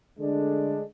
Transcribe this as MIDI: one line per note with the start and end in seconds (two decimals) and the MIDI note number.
0.19 0.81 50
0.19 0.81 56
0.19 0.81 57
0.19 0.81 62